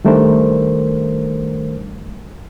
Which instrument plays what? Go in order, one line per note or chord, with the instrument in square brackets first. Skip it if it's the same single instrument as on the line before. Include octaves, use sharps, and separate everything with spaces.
[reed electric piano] D#3 G3 A3 D4 A#4 C5